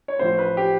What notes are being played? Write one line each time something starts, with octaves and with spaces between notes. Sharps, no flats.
C#5
A1 A2 F3 C5
B4
G4